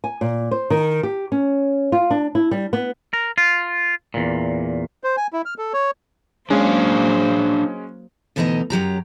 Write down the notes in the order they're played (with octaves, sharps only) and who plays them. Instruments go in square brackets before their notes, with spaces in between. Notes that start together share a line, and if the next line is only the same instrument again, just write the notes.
[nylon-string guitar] G#5
A#2
C5
D#3
G4
C#4
F4
D4
E4
G3
B3
[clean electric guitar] A#4
F4
E2 A#2
[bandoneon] C5
G#5
E4
F6
A4
C#5
[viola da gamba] F#3 A#3 C5 [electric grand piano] G#3 C#4 [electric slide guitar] D4 G#4 F5
[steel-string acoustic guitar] D2 B2 E3 D#4 D#5 A#5
F#2 F#3 G4 A#5